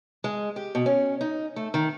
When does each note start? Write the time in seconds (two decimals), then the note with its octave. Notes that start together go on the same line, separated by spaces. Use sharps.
0.24 G#3
0.56 G4
0.75 B2
0.86 C#4
1.21 D#4
1.56 A3
1.74 D#3